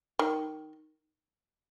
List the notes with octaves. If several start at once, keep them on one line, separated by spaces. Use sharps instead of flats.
D#3